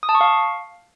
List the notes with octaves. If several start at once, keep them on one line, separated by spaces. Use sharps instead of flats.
D#6
A5
C#6
F5